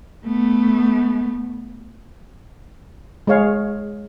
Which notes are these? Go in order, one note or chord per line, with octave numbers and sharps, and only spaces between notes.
A3 B3
G#3 G#4 C#5 F5